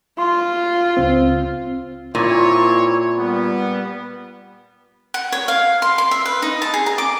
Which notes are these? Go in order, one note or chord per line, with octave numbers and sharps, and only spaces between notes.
F4 C6
C#2 C4
A#2 C4 E4 C#5
G3 B3
F#5
C#5
F5
C6
C6
E5
B4
D#4
A5
G#4
A#5
D6